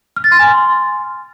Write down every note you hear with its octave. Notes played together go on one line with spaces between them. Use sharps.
F6
A6
C6
G#5
C6